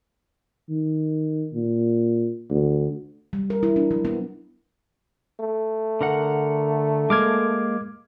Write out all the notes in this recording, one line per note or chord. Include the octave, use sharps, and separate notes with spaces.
D#3
A#2
D2
G3
A#4
E4
D4
F#3
B3
A3
D3 A#4 F#5
G#3 A#3 D6 F6 G#6